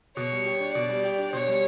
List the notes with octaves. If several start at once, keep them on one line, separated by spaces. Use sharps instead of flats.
B2 C#5
G3
G4
D4
B2 D5
G3
G4
D4
B2 C#5
G3